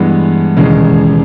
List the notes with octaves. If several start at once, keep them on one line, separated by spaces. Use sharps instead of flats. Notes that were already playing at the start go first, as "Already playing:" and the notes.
Already playing: G2 E3 G#3 B3
E1 D#2 C#3 E3 G#3